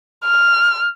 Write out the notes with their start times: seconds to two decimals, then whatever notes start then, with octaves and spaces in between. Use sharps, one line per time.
0.25 F6